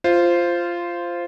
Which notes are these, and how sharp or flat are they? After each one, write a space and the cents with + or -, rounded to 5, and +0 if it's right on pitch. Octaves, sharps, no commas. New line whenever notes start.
F4 -10 C5 +0